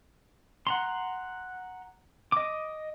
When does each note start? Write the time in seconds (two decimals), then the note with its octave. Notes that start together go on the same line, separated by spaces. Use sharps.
0.67 F#5 A#5 C6
2.32 D#5 D6